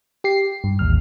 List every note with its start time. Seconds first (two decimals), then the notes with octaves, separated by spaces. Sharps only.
0.24 G4 C7
0.64 G2
0.79 A1 D#2 F6